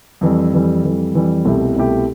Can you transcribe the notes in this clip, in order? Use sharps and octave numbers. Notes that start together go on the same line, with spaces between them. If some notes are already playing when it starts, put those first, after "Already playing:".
F2 E3 G3
F2 E3 G3
F2 E3 G3
F2 E3 G3
C2 B2 A3 E4 G4
C2 B2 A3 E4 G4